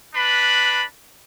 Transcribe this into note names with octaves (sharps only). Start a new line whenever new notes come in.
D4 B4 B5